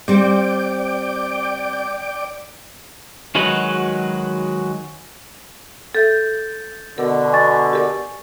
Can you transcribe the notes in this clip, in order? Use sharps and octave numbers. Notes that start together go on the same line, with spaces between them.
G3 C4 D5 G5 D6
D#3 F#3 G#3 F#4 B4
A4 E5 G6 A6
B2 D3 A#4
G#5 C#6 A6
G4 A#4 D5